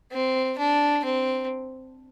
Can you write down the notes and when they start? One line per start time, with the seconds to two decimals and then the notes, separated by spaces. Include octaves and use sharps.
0.12 C4
0.58 D4
1.04 C4